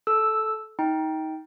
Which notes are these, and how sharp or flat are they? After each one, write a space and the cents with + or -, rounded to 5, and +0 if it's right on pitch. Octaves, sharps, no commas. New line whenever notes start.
A4 -15 E6 +0
D#4 +25 G5 -5